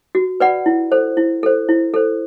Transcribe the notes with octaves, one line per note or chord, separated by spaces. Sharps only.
F#4
B4 D5 F#5 B5
E4
A4 C5
E4
A4 C5
E4
A4 C5